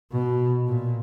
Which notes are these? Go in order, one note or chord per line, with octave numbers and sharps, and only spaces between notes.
B2
A#2